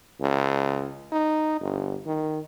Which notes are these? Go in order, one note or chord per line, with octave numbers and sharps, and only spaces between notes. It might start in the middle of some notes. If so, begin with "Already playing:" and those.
C#2
D#4
G1
D#3